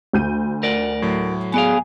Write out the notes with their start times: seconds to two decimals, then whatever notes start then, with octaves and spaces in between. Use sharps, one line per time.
0.13 D2 G6 D#7
0.63 A#4 D5 F#5
1.02 A2 F#3
1.54 B3 G#4 D5 F5